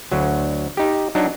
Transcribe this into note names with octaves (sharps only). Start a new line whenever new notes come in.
D2 F#3
D#4 G4
F#3 D4 D#4